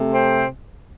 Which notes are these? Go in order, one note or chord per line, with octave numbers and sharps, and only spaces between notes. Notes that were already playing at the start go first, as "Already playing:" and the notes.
Already playing: C3 A3
C4 C5